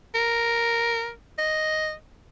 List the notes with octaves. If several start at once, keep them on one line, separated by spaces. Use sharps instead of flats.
A#4
D#5